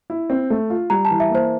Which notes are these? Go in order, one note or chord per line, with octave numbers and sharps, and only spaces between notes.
E4
C4
A3
F4
G3 A#5
A5
E3
E5
A#3
C5